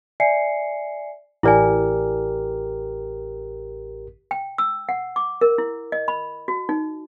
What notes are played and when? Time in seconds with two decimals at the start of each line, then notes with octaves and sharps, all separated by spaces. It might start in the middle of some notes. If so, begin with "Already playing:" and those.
0.20 D5 E5 G#5 C7 C#7
1.43 A1 E4 G4 A#4 D5 G#5
4.31 G5
4.58 E6
4.89 F#5
5.16 D6
5.41 A#4
5.58 E4
5.92 D#5
6.08 B5
6.48 F#4
6.69 D#4